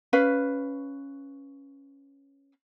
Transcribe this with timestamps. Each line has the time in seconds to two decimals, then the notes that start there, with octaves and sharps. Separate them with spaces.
0.13 C#4 B4 F5